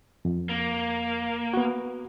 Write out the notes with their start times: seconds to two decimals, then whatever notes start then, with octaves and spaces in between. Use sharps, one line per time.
0.25 F2
0.49 A#3
1.54 B3 F#4